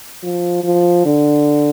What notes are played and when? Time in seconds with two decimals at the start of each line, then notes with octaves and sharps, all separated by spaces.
0.23 F3
0.64 F3
1.05 D3